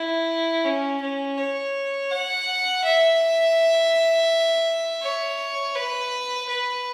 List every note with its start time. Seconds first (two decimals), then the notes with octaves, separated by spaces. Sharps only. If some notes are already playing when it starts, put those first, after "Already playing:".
Already playing: E4
0.64 C#4
1.01 C#4
1.38 C#5
2.11 F#5
2.83 E5
5.03 C#5
5.75 B4
6.48 B4